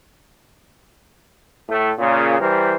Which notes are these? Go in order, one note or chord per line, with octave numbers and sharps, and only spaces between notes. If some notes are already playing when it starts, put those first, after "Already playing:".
A2 A3
A#2 C#3
E3 G3 A#4 C5